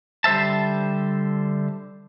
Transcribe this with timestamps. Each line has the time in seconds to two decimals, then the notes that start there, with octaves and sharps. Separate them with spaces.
0.24 D3 G3 C5 E5 A5